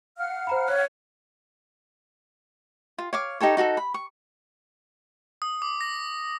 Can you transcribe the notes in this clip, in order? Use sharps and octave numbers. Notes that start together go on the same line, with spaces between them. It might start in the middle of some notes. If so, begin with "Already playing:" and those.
F5 F#5 F6
C5 A#5 B5
C#5 F#6
F4
C#5 F5 D6
D#4 G4 A4 C#5
D#4 F#4 G#4 A4
B5
C#6
D#6
D6
A#6